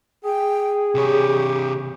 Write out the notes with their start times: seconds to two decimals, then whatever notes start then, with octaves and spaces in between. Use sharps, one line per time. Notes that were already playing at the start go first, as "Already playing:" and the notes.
0.24 G#4 G5
0.95 C3 G4 C#5